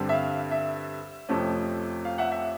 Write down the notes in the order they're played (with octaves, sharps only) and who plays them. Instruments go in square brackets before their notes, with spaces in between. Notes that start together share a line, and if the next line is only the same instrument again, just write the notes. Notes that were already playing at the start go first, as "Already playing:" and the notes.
Already playing: [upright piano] G2 D3 G3 C4
E5
F5
E5
F2 C3 F3 A3 C#4
F5
E5 F#5
E5